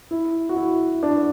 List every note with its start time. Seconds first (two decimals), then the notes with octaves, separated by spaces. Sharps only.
0.11 E4
0.49 F#4
0.56 E4
1.03 D4